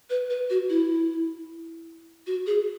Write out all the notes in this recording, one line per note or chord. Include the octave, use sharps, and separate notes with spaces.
B4
B4
F#4
E4
F#4
G#4